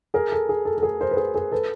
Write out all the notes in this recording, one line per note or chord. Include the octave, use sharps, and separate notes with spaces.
G#4 A#4
A4
G#4
A4
A4
G#4 A#4
A#4 C5
B4
G#4 A#4
G#4 A#4
A4 B4